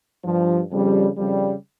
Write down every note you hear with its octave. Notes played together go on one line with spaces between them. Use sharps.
G2 F3
F2 C#3 G3
F2 C#3 G3